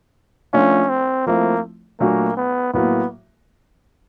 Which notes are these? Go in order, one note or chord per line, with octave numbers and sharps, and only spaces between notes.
F3 A3 C#4 D4 F4
C4
F3 A3 A#3 C4 E4
A#2 F#3 A3 A#3 D4 F#4
B3
A2 F#3 A#3 B3